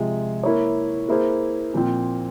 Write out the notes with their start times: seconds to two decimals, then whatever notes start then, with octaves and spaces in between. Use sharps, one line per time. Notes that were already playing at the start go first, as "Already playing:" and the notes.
Already playing: C3 F3 G#3
0.43 A#3 E4 A#4 C#5
1.09 A#3 E4 G#4 C5
1.74 A#2 F3 C4